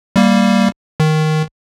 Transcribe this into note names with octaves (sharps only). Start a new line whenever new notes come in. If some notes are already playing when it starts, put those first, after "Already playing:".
G3 A#3
D#3